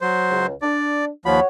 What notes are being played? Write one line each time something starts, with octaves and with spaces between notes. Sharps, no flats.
F#3 C5
C#2
D4 D5
D#2 F3 F#4 C#5 B5